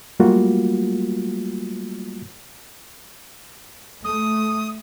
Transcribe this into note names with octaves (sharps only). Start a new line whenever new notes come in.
F#3 G3 A3 A#3 F4 F#4
A3 D#6